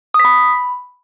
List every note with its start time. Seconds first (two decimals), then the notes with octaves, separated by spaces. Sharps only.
0.14 D#6
0.20 B6
0.25 B5